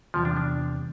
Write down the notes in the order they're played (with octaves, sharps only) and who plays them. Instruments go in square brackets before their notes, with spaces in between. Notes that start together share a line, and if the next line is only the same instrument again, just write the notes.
[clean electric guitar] E2 C3 G3 [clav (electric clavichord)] F3
[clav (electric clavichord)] D4
D4